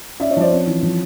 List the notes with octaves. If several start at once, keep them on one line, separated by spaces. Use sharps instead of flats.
C#4 D5 E5
C#5 D#5
F3 C5 D5
C4 C#5
E3
F3